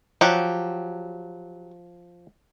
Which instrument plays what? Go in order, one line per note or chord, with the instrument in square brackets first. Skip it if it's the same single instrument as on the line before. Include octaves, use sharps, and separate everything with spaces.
[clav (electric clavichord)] F3 [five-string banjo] F#3 G4 F#5